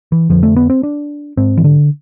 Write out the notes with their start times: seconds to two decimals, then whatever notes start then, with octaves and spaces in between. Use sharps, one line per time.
0.12 E3
0.29 F2 D3 F3
0.43 A3
0.56 B3
0.70 C4
0.83 D4
1.37 G#2 C4
1.57 E3
1.64 D3